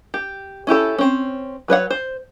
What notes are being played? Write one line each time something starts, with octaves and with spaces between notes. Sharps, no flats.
G4
C#4 E4 G4 A4
C4 C#4
F#3 B4 C#5 F#5
C5